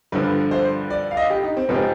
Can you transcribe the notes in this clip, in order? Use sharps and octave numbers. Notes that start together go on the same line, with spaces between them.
G2 D3 F3 B4
C5
D5
F5
D#5
G4
D#4
C4
G#2 F3 B3 C4 G4